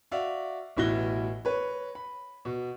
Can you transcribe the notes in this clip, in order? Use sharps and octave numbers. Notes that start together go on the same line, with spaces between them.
F#4 D5 E5 F5
A1 B2 E4 F#6 A#6 G7
B4 C#5
B5
B2